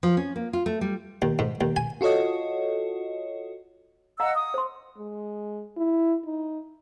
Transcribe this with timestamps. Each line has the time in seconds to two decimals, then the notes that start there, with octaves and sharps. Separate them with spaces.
0.03 F3
0.17 C#4
0.36 A#3
0.53 F4
0.66 A3
0.81 G3
1.22 D#2
1.39 G#2
1.61 D#2
1.76 G#5
2.01 F4 F#4 A4 C#5 D#5
4.20 D#5 F5 F#5 A#5 E6
4.36 D#6
4.54 C5 C6
4.98 G#3
5.77 E4
6.26 D#4